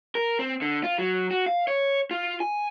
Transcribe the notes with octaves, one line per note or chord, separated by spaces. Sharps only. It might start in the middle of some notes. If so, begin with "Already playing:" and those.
A#4
C4
D3
F4
F#3
F#4
F5
C#5
F4
G#5